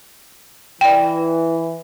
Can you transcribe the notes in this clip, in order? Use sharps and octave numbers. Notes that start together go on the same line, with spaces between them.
E3 D5 G5